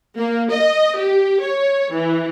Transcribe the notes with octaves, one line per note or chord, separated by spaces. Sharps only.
A#3
D#5
G4
C#5
E3